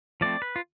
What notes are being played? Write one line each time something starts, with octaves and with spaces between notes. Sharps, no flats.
F3 A3 C4 D5
B4
F4